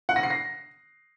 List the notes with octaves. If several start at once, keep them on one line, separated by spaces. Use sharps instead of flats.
F#5
A#6
C7
A#6